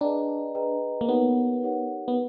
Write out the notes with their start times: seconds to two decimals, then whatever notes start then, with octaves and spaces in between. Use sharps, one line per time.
0.01 D4 G#4 B4 D#5 G5 A#5
0.55 G#4 B4 D#5 G5 A#5
1.01 A#3
1.08 B3 D#4 G4 A#4 C#5 F#5
1.63 D#4 G4 A#4 C#5 F#5
2.08 B3